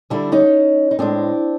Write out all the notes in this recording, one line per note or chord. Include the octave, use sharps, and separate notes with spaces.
D3 G3 D4 E4
C#4 D#4
D#4
A2 F3 G#3 C4 D4